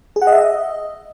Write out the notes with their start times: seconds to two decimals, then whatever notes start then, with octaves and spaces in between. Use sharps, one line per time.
0.16 G#4
0.22 F#5
0.27 D#5
0.32 E5
0.38 D#5